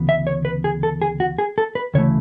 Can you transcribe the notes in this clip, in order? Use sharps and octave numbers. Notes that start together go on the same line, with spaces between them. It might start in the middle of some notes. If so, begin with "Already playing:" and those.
Already playing: D2 C#3 E3 B3
E5
C#5
B4
G#4
A4
G#4
F#4
G#4
A4
B4
D2 C#3 E3 A3 C#5